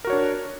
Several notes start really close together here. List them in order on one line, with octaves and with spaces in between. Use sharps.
A#4 F#4 C#5 D4